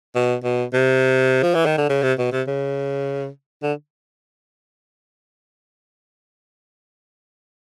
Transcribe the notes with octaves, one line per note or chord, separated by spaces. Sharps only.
B2
B2
C3
F3
E3
D#3
D3
C#3
C3
B2
C3
C#3
D3